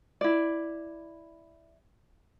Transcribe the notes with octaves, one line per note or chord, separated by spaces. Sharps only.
E4 D5